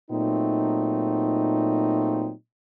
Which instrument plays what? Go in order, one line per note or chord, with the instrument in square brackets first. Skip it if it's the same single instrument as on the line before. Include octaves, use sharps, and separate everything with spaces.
[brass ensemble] A#2 F#3 A3 C4 D#4